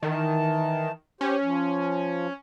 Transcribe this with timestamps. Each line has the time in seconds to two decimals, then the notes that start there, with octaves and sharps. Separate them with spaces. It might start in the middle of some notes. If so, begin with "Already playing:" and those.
0.03 D#3 E3 A5
1.21 C#4 G4 C5
1.42 F3